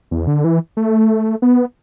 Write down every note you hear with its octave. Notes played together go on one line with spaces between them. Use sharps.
E2
D3
E3
A3
B3